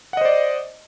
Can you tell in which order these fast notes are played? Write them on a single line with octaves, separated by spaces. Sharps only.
F#5 D#5 C5 D5